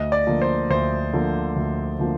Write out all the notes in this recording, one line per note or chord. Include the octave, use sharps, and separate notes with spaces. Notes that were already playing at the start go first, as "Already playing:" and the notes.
Already playing: D2 D#5
D5
D3 F3 A#3
C5
D2 C5
D3 F3 A#3
D2
D3 F3 A#3